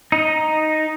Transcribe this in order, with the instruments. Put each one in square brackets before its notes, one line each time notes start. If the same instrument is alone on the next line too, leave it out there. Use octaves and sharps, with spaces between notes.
[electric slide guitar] D#4